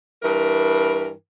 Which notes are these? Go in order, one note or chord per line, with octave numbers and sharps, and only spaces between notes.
G2 E3 A#4